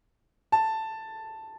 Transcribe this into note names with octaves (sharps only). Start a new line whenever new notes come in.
A5